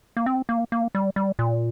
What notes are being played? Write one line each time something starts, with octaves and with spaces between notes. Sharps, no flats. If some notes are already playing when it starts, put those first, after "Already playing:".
A#3
C4
A#3
A#3
G3
G3
A#2